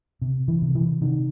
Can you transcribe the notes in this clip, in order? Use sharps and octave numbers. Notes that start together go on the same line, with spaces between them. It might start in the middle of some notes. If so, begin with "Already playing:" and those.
C3
E3
C3
E3
C3 D#3